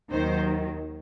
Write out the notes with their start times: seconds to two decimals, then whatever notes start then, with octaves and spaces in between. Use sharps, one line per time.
0.11 D#2 D#3 F#3 C5